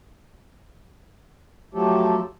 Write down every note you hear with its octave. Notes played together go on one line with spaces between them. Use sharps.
F3 F#3 A3 G4 A4